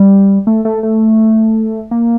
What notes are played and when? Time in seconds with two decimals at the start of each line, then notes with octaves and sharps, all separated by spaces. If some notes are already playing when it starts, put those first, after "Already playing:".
Already playing: G3
0.47 A3
0.65 A3
0.83 A3
1.91 A#3